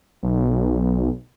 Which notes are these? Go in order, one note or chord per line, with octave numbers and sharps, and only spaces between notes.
B1